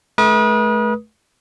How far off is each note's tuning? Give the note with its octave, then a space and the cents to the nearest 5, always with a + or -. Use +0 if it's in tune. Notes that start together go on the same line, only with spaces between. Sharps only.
A3 -35 B4 -40 D#6 +0